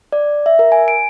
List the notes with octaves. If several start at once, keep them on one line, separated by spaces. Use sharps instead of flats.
D5
E5
A#4
G#5
D7